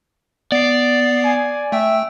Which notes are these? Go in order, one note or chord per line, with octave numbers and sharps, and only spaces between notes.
B3 D5 C7
G#5
A3 E5 G5